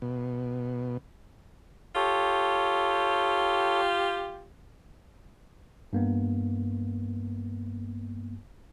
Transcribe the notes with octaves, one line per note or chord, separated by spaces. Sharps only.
B2
F4 G4 A4 C#5
G2 A#3 B3